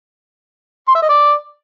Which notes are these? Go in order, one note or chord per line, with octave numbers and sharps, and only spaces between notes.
C6
E5
D#5
D5